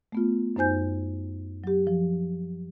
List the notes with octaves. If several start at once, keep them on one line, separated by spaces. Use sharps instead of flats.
A3 B3 F4
F#2 D#4 C5 G#5 G6
F#3 G4
F3